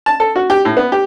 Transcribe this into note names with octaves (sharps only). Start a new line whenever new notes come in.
A5
A4
F#4
G4
A2
B3
G4